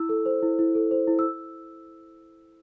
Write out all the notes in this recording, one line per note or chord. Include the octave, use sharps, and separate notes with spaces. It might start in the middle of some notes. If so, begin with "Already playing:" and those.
Already playing: E4 E6
A4
C5
E4
E4
A4
C5
E4
E6